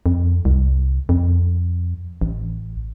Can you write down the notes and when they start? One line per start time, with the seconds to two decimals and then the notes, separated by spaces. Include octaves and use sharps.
0.06 F2
0.45 C2
1.09 F2
2.21 A1